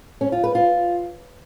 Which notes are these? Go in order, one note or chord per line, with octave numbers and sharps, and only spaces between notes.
C#4
F4
B4
F4